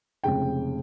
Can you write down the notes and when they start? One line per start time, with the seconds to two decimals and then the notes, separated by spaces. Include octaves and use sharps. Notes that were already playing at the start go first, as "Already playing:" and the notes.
0.24 F1 F2 C#3 G#3 G5